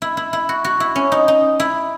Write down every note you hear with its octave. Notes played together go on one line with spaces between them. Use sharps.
E4
E4
E4
F#4
F#4
E4
C#4
D#4
D#4
E4